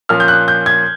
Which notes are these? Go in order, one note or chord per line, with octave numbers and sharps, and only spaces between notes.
A#2 F3 A#3 C#4 F4 F6
G6
F#6
G6
G#6